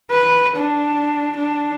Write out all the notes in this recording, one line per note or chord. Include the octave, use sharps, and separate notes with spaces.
B4
D4
D4